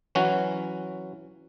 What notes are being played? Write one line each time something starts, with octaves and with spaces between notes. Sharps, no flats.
E3 F#3 C#4 F#4